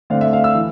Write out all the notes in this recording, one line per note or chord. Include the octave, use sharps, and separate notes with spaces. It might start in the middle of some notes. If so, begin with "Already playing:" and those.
D3 A3 C4 F5
E5
F5
E6
E3